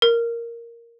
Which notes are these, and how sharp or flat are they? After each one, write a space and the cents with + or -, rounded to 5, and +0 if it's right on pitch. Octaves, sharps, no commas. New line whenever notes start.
A#4 +0